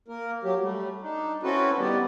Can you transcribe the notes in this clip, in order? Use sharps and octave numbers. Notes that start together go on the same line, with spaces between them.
A#3 A#4
F#3 G4
G3 A3
D4 D#4
C4 C#4 E4 F#4 A4 B4
D#3 G3 B3 G4 D5